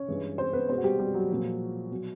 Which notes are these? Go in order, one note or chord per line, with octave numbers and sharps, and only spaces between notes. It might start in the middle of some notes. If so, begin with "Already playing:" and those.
Already playing: C#4 C#5
G2 E3 G#3
C4 C5
B3 B4
B2 G#3 C4 C5
F#4
G3 G4
G3 G4
F#3 F#4
A#2 F3 G#3
B2 F#3